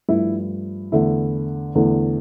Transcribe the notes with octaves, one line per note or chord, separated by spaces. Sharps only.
G2 F3 A3 E4
E2 D3 A3 E4
E2 D3 A3